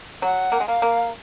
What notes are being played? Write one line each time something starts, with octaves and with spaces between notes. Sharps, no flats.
F#3 F#5
A#3
G#3
A#3 F5
A#3